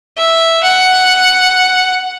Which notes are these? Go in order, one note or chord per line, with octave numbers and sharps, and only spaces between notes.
E5
F#5